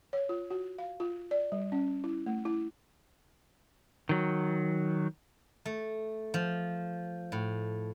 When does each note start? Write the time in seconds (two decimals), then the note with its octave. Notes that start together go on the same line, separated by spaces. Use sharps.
0.13 C#5
0.29 F4
0.51 F#4
0.78 F5
1.00 F4
1.31 D5
1.52 G3
1.72 C#4
2.04 E4
2.26 A3
2.45 E4
4.09 D#3 F#3
5.66 A3
6.34 F3
7.32 A2